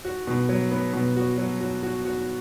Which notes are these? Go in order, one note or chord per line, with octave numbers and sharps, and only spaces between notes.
F#4
B2
F#3
B3
B2
F#4
F#3
F#4
F#4
F#4